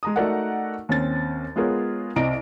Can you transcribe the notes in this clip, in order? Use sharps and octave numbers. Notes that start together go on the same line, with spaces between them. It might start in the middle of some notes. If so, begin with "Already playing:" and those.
G#3 A#5 D#6
A3 D#4 F#4 A#4 D5 F#5
D#2 C4 C#4 A6
G#3 B3 F4 G#4 A#4 C#5
C2 C4 D#5 A#5 D7